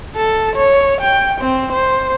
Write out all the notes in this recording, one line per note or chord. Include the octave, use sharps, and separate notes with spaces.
A4
C#5
G5
C4
C5